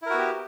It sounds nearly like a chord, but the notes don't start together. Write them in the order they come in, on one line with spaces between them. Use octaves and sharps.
E4 A#4 F#4 B3 G4